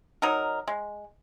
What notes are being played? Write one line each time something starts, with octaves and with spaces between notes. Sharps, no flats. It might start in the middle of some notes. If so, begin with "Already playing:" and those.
F#3 D#4 A#4
G#3